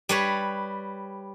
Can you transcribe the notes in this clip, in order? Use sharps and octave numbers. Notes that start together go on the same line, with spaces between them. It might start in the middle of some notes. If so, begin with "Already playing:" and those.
G3 B4 C#5